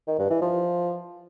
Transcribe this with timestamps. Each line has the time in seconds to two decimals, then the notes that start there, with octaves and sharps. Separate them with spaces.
0.08 D#3
0.19 G2
0.30 E3
0.42 F3